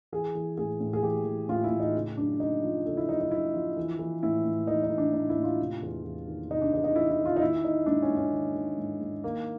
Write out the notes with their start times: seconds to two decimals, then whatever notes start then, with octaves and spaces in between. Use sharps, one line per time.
0.12 E3 G#4
0.35 E3
0.58 A2 G#4
0.80 A2
0.93 G#4
1.03 E3 G4
1.26 E3
1.49 A2 F4
1.64 E4
1.71 A2
1.80 D#4
1.95 C#3
2.17 F#2 D4
2.40 F#2 D#4
2.63 F3
2.85 C#3 A4
2.97 E4
3.09 F#2 D#4
3.21 D#4
3.31 F#2 E4
3.54 F3
3.77 E3
3.99 E3
4.23 A2 E4
4.45 A2
4.67 E3 D#4
4.83 D#4
4.90 E3
4.98 D4
5.13 A2 D#4
5.29 E4
5.36 A2
5.44 F4
5.59 C3
5.82 E2
6.04 E2
6.28 D#3
6.50 C3 D#4
6.61 D4
6.73 E2 D#4
6.84 D#4
6.95 E2 E4
7.11 E4
7.19 D#3
7.26 F4
7.36 D#4
7.42 D#3 E4
7.65 D#3 D#4
7.86 G#2 D4
8.02 C#4
8.10 G#2
8.17 C#4
8.32 D#3
8.55 D#3
8.78 G#2
9.01 G#2
9.24 D#3 A#3